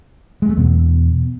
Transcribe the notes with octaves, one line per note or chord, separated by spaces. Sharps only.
G#3
A3
E2 B2 B3